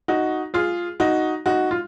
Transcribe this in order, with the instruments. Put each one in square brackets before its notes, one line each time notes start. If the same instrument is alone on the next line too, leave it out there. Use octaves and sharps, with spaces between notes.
[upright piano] D#4 F#4
F4 G#4
D#4 F#4
D#4 F#4
F4